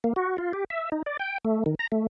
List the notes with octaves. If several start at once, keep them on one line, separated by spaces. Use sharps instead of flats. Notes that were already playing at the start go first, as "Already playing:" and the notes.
A#3
F#4
F4
G4
E5
D#4
D5
G5
A3
D#3
A#5
A3